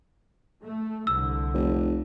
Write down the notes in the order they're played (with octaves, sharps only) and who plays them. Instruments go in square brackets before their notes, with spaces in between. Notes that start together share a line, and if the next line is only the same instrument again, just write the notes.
[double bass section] A3
[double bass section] C2 D3 [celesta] E6
[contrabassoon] F1